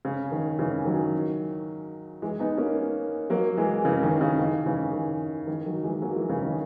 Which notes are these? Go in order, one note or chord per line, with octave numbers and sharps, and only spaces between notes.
C#3
D#3
C#3 E3
D#3 F#3
E3 G#3
B3 D#4
A#3 C#4
F#3 A#3
E3 G#3
C#3 E3
D#3
C#3
D#3
C#3 E3
D#3
D#3
D#3 F#3
E3 G#3
F#3 A#3
E3 G#3
C#3 E3
D#3